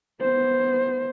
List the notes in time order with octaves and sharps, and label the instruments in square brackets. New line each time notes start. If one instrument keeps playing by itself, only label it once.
[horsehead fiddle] B3 C5